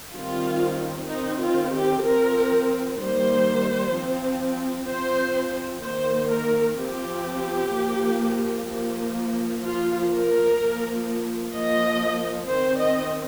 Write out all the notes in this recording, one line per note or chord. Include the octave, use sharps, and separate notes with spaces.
D#3 G3 C4 F4
D#3 C4 D#4
F4
G4
F3 C4 A#4
D#3 G3 A#3 C5
F3 C4
F3 C4 C5
D#3 A#3 C5
A#4
F3 C4 G4
F3 A#3
F3 A#3
F3 A#3 F4
A#4
F3 A#3
F3 A#3 D#5
D#3 C4 C5
D#5